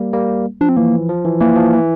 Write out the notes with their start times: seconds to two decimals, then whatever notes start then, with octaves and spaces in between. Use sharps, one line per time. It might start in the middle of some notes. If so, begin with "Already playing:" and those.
Already playing: G3 A#3
0.13 G3 A#3
0.61 F3 D4
0.69 C4
0.77 E3 A#3
1.09 F3
1.25 E3
1.40 E3 A#3
1.56 F3
1.73 E3